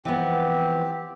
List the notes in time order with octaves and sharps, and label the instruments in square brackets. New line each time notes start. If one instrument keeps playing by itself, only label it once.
[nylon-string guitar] E3 F3 B3 [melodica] C4 G4